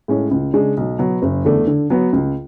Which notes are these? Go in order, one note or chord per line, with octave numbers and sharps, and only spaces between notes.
A2 G#3 C#4
C#2
C#3 G#3 D4
B1
B2 F#3 B3
F#1
E2 D3 A3 D4
D3
F#3 B3
C#2